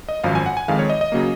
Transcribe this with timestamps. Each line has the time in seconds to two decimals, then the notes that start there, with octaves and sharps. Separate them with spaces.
0.09 D#5
0.24 G#1 F#2 F3 F5
0.35 G#5
0.46 F#5
0.57 G#5
0.68 F2 D#3 G#3 F5
0.79 C#5
0.89 D#5
1.01 D#5
1.12 C#3 F#3 A#3